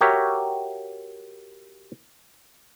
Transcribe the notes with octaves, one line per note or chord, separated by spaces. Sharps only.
F#4 G4 A#4 C#5 E5